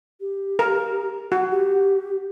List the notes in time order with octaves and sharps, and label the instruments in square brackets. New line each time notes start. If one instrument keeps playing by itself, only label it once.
[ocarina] G4
[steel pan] A#4
[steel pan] F#4 [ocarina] F#5
[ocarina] G4